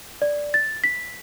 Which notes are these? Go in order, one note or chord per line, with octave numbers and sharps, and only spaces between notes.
D5
A6
B6